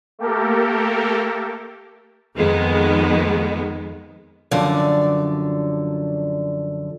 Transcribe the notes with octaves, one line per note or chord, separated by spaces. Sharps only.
A3 A#3 G4 A4 A#4
F2 D#3 G#3 B3
F#2 D3 F3 D5